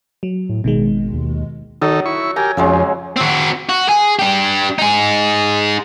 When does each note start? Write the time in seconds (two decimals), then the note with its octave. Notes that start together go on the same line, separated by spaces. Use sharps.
0.23 F#3
0.49 A2
0.64 G#1 B2 D#3 G#3
1.13 D#2
1.82 D#3 F#3 D#4 A4
2.06 E4 C#6
2.36 G4 A#4 G#5
2.57 F2 C#3 F#3 G#3
3.17 C4 F#4
3.69 F#4
3.88 G#4
4.19 D4 G4
4.79 D#4 G#4